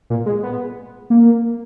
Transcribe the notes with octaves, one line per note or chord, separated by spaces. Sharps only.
A#2
G#3
B3
A#3